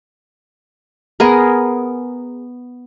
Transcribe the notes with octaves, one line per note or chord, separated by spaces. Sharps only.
B3 G#4 A#4